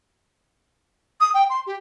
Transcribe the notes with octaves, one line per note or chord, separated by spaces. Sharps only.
D#6
G5
C6
G4